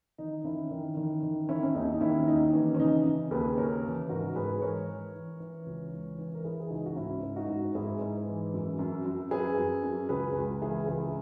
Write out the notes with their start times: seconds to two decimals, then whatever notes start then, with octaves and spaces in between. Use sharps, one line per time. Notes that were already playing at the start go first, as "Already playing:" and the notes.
0.18 D#3 D#4
0.44 D#3 C#4 E4
0.71 D#3
0.97 D#3
1.23 D#3
1.49 D#3 C#4 E4
1.63 C#4
1.75 D#2 D#4
1.93 D#4
2.00 D#3 C#4 E4
2.27 D#2 D#4
2.53 E3 C#4
2.75 C#4
2.79 C#3 D#4
3.05 C#3
3.31 D#2 G#4 B4
3.57 C#3 A#4 C#5
3.84 E3
4.09 G#2 F#4 A#4
4.36 G#2 G#4 B4
4.61 E3 A#4 C#5
4.88 E3
5.14 E3
5.40 E3
5.66 C#2
5.93 E3
6.18 E3
6.34 A#4
6.44 E3 E4 G#4
6.60 G#4
6.70 C#2 D#4 F#4
6.86 F#4
6.96 G#2 C#4 E4
7.23 G#2
7.36 D#4 F#4
7.48 G#2
7.75 G#2 E4 G#4
8.01 G#2
8.27 E3
8.53 F#2
8.79 F#2
9.05 F#2
9.31 F#2 G#4 B4
9.58 F#2
9.83 F#2
10.09 C#2 G#4 B4
10.36 C#2
10.61 E3 E4 G#4
10.88 C#2 E4 G#4